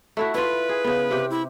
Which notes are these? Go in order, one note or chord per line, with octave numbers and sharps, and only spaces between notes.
A3 E4 F#4
E4 F4 B4
G#4
C#3 B3
C3 G4
E4